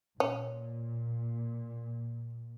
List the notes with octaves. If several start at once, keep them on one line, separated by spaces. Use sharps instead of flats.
A#2 C#4